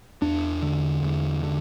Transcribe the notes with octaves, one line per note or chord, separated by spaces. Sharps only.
E2 D4
D3
E2
D3